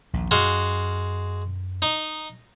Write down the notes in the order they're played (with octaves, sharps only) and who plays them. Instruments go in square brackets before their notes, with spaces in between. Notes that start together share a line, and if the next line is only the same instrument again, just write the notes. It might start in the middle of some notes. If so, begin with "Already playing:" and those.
[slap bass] A#1 D#2 A#2
[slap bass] F#2 [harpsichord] G#3 F#4 F5
[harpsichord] D#4